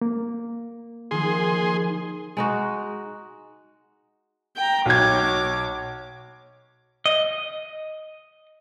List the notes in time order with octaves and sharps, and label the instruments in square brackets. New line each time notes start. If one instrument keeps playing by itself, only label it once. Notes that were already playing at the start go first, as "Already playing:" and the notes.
[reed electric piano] A#3
[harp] D#3 F3 [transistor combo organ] G#4 C6
[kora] G#3 D#4 F#4
[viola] G5 A#5
[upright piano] B1 G#6 [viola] C#5 D6
[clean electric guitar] D#5